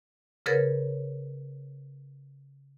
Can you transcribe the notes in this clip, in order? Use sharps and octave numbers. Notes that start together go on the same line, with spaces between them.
C#3 G#4 A#4 B4 C#5 A6